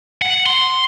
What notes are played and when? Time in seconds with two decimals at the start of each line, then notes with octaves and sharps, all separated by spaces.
0.22 F#5
0.46 C6